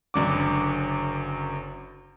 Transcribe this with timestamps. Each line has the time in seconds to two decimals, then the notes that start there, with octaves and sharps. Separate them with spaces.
0.14 F#1 F#2 D3 D6